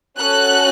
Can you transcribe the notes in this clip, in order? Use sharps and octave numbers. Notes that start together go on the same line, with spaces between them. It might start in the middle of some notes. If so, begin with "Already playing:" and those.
C#4 F#4 A4 F#6